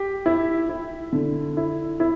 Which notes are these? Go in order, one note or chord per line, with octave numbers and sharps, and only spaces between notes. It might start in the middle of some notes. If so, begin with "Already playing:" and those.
Already playing: G4
E4
E4
D3
E4
E4